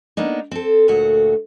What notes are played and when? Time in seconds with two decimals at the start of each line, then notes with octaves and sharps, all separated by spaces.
0.17 A#3 B3 D4 D#4
0.51 C4 A4
0.88 D2 A#2 A3 F#4 F#5